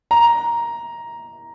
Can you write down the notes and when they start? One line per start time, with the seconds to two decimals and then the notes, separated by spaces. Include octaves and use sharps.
0.11 A#5